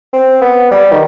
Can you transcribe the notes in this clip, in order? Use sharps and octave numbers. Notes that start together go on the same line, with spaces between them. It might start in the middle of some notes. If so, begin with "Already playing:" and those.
C4
B3
G3
D#3